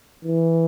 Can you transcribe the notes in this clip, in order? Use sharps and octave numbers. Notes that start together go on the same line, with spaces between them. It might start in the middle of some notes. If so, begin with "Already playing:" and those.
E3